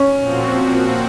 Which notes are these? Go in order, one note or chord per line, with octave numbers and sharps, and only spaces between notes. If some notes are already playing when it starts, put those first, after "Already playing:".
Already playing: C#4
A#2 F3 C4 F#4